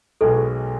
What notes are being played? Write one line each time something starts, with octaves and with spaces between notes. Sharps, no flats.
B1 B2 G#3 B3 A4